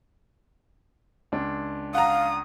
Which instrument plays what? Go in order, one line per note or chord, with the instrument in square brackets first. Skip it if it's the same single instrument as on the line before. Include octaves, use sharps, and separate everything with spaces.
[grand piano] C#2 D4
[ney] F5 [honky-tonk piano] F#5 A#5 [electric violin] D#6